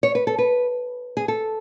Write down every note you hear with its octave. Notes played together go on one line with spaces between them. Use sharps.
C#5
B4
A4
B4
G#4
A4